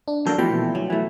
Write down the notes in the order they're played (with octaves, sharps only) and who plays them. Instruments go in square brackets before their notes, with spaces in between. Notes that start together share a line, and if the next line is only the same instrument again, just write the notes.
[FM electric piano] D4
[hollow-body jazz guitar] F#3 A#3 D4 [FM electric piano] A4 G6
[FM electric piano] B2 G5 [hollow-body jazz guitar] E3 F3 A3
[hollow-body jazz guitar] D2 [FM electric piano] F#3
[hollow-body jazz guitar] E3 A3